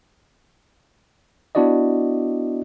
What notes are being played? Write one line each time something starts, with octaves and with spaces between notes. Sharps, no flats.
B3 D4 E4 F#4 D5 D#5